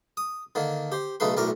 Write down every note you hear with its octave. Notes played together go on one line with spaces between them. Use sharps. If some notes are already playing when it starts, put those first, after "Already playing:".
D#6
D3 D#3 A#3
G4 C5
B1 C#3 A3 D#4 B4 C6
B1 F#2 A2 A#4 D5 A#5